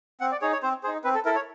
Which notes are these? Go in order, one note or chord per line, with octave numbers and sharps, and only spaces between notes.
C4 F#5
D5
D#4 G#4 C#5
C#5
C4 C5
D#4 G#4 C5
C4 B4
A4
E4 A4 A#4
C#5